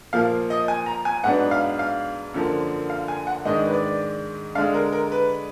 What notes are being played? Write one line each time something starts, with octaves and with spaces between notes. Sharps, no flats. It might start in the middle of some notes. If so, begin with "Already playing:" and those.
A#2 F3 A#3 F5
D#5
G#5
A#5
G#5
G#2 F#3 B3 D4 F#5
F5
F5
F#2 D3 F3 A#3
F5
G#5
F#5
G#2 D#3 G#3 D4 D#5
B4
D5
D3 G#3 D4 F5
A#4
A#4
B4